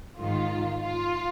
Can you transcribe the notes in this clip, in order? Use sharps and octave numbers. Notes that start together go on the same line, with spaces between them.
G#2 D#3 F4
F4